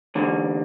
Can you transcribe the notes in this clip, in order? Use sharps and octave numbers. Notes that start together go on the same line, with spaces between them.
E2 D3